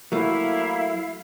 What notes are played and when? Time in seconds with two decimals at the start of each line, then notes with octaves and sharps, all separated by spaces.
0.12 F#3 A3 A#3 E4 F5